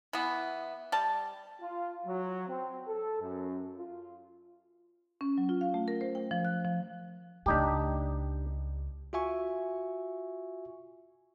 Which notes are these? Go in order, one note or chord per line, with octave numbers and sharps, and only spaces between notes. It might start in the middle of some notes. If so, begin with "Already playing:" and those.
E3 B3
G3 A5
F4
F#3
C4
A4
F#2
F4
C#4
F#3
F4
F5
A3
A#4
C5
G5
F3
F#6
F3
C#2 A3 D4 D#4 G4
F4 F#4 E5 G#5 C#6